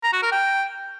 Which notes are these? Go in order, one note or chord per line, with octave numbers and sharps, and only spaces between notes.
A#5
F#4
A#4
G5